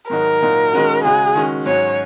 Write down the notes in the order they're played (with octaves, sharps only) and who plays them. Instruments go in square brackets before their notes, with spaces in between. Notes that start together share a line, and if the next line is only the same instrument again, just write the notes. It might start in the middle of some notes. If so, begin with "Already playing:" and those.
[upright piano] G#2 D#3 F#3 D#4 F#4 [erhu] A#4
[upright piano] A#2 F#3 D#4 F#4
D#3 G#3 C#4 F#4
[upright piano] C#3 G#3 F#4 [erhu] G#4
[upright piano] D#3 G#3 C#4 F#4
[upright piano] G#2 F#3 C#4 F#4 [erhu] C#5